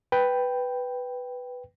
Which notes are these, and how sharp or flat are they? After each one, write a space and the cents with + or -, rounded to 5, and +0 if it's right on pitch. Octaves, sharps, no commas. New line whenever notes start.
B4 +0 G5 +0